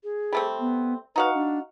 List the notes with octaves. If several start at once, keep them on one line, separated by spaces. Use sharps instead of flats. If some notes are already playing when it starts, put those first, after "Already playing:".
G#4
G3 A3 C4
B3
D#4 F#4 B4 F5
D4